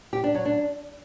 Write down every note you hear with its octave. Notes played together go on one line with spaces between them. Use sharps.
G4
D4
F#3
D4